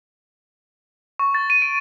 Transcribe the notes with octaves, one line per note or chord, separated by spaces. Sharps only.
C#6
A6
D#7
D7